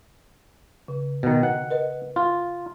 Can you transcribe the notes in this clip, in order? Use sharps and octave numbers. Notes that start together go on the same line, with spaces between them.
C#3
B2 D#3
D#5 F#5
A#4 B4 D#5
F4